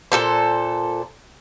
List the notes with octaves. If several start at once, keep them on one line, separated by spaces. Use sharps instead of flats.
A#2 A4 C5